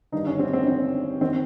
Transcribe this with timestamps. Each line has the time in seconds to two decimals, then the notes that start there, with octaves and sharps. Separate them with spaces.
0.12 G1 G2 D#3 D#4
0.26 C#4
0.39 C4
0.53 C4
0.67 C4
1.21 D#3 C4